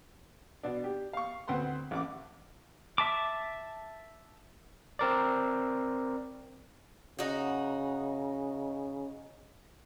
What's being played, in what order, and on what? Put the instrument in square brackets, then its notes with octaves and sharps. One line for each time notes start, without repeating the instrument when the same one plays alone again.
[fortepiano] B2 D4
G4
F5 C#6
D2 C4 B4 F#5 C6
A1 F#5 D6
[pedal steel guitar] E5 A5 D6
[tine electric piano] C4 A#4 D5
[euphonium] C#3 [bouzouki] D#4 F#4